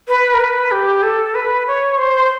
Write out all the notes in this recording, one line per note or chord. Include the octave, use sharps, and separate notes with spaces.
B4
A#4
B4
G4
A4
B4
C#5
C5